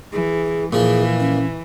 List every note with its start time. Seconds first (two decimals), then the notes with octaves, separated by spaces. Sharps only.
0.12 E3 G#4
0.73 A#2 E3 F3 G#4
1.20 C#4